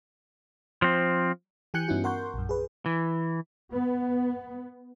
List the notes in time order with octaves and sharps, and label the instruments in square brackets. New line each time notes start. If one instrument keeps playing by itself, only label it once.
[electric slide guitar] F3 C4
[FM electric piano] E3 G4 G#5 F#6 G6 C#7
G2 B3 C#4 D#4 E4 F#4
A#4 F#5 C6 C#6 G6
A#1 F#2
G#4 B4
[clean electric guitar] E3
[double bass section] B3